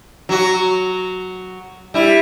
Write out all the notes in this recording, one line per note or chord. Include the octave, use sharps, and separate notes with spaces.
F#3 F#4
G3 E4